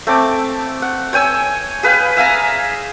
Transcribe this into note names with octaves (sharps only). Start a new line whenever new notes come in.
A3 C4 D6
F#5
C#5 G5 G#5 E6
G#4 B4 F5 G5
E5 F5 G#5 A#5